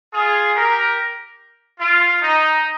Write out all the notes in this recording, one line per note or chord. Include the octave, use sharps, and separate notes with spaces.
F4 G#4
G4 A#4
F4
D#4